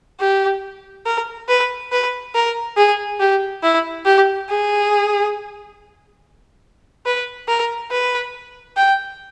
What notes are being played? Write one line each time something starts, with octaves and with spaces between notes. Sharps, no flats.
G4
A#4
B4
B4
A#4
G#4
G4
E4
G4
G#4
B4
A#4
B4
G5